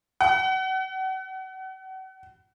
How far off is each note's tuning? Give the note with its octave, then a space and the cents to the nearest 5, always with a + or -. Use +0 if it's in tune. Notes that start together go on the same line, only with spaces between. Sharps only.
F#5 +35